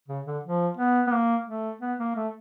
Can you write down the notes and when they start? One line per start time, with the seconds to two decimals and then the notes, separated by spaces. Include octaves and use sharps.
0.08 C#3
0.26 D3
0.43 F3
0.77 B3
1.07 B3
1.12 A#3
1.47 A3
1.81 B3
1.99 A#3
2.16 A3